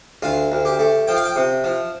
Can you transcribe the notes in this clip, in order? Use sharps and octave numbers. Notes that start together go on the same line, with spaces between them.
D2 F4
D2
G4
A3
F3 G5
F5
G5
C3
F3